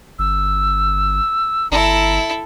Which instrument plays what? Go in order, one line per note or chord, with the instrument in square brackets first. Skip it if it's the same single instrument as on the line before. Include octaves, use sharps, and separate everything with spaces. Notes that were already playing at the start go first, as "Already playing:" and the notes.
[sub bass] G1 [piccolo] E6
[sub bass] G1 [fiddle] E4 A4 [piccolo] A#5